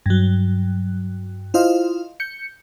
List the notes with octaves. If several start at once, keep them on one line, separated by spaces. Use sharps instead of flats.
G2 F#3
E4 F4 C5 D#5 F5
G6 C#7